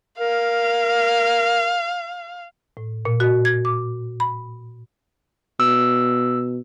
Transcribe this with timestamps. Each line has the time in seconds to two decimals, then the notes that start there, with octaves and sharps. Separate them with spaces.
0.19 A#4 F5
2.77 A2
3.05 A#2
3.20 F#4
3.45 G#6
3.65 D6
4.20 B5
5.60 B2 E6